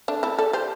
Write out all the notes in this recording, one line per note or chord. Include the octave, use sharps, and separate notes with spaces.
A3 D4
E4 A4
A4 D5
G4 C5